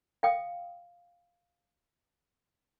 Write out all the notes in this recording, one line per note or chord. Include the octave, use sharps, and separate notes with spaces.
F5 G5 D#6